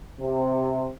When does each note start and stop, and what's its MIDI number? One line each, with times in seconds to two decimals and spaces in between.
0.20 0.87 48